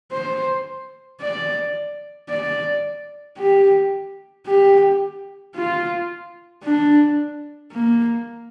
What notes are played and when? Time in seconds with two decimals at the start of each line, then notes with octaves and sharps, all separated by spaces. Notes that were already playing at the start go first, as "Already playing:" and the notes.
0.12 C5
1.21 D5
2.30 D5
3.38 G4
4.47 G4
5.55 F4
6.64 D4
7.72 A#3